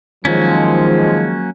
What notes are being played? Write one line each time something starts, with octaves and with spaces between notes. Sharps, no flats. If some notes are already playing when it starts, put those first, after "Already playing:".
D#3 F3 F#3 G#3 A#3 C#4